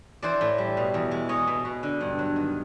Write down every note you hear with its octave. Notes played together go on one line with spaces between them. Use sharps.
E3 C5 D5
A2
G3
B2
E2
G#3
G#3 C#5 D#5
B2
B2
D3
G2
F#3
D#3